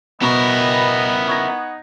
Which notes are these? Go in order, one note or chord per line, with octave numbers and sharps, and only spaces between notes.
B2 B3 E4 A#4 B4 D#5 C#6
D#4 F#5 C#6 G#6 A#6